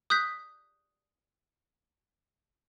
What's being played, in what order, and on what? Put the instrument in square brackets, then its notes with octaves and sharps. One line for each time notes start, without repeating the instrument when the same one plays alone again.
[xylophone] D#6 F#6 G6 B6